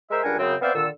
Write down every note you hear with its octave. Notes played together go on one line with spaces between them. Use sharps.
G#3 A#4 C5 E5
C#2 G3 D4 A#4 F#5 G#5
F#2 C#3 C4
B3 C4 C5 D5 E5 F5
A#2 D3 D#3 A4 E6